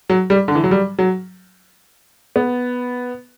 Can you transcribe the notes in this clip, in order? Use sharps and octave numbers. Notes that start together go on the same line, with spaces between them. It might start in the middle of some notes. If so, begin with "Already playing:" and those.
F#3
G3
D3
E3
F#3
G3
F#3
B3